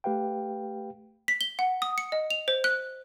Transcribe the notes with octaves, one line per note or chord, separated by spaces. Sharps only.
A3 G4 B4 F5 G5
B6
G7
F#5
D#6
C#7
D#5
F7
C5
F#6